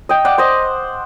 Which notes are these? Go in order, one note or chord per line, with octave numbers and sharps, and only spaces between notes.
D#5 G5
D5 F#5
C5 D#5